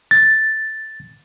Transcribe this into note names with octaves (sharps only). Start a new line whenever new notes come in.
A6